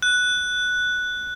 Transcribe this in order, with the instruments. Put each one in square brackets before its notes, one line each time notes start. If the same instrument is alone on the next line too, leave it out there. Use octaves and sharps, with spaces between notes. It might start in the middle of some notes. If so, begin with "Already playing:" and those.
[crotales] F#6